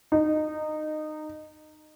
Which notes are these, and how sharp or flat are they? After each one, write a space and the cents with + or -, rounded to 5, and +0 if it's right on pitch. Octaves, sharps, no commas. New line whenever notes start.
D#4 -20